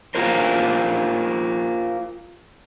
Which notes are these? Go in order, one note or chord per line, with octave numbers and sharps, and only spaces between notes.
F4 G4 A#4 C5